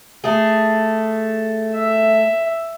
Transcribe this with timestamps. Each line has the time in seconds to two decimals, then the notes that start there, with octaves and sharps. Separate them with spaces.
0.24 A3 G#4
1.75 E5